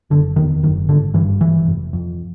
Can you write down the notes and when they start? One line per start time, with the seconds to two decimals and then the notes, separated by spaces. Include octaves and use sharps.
0.10 F#1 D3
0.36 E2 D#3
0.63 F#1 D#3
0.89 G#1 D3
1.14 G2 E3
1.40 G#1 E3
1.67 F1
1.93 F2